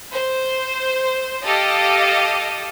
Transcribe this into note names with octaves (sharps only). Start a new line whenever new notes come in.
C5
G4 A4 D#5 F5